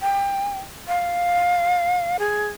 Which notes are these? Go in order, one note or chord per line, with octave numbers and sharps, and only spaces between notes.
G5
F5
G#4